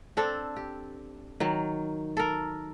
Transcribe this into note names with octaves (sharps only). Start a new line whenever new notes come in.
C4 D4 A4
G4
D#3 F#3
A4 A#4